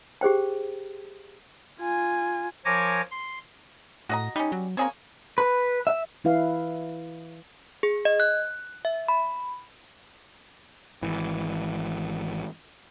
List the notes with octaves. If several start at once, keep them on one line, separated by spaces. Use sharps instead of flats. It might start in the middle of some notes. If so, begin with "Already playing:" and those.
G4 G#4 C5 G5
F4 G#5
F3 A#4 C#5 G#5 D6 A#6
C6
A2 F#4 D#5 A#5
G3 C#4 D#4
F#3
A#3 C4 G#4 C#5
B4
E5
E3 E4 B4 F5
G#4
D#5
F#6
E5
B5
G#1 E3